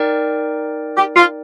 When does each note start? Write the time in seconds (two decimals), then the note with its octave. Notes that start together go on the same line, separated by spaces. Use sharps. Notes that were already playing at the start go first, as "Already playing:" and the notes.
Already playing: D#4 A#4 D5 G5
0.97 G4
1.16 F4